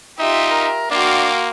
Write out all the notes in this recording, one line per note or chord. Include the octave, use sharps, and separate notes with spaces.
D#4 F4 G4 E5
A#4
A#3 D4 F#4 F5 G5 C6